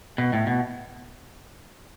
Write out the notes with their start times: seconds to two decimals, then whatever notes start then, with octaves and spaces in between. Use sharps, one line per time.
0.18 B2
0.33 A2
0.47 B2